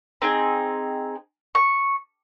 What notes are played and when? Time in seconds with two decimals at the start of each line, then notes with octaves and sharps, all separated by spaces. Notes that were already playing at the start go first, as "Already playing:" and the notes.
0.22 C4 D#4 G#4
1.55 C#6